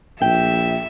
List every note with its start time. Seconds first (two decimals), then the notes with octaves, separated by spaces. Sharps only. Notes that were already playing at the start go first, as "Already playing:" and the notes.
0.22 A#1 E5 G5